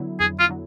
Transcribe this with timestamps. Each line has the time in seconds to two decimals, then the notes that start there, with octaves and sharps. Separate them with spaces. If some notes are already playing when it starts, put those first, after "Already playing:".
Already playing: D3 F#3 B3 E4
0.20 F2 G#4
0.40 F4
0.49 D3 F#3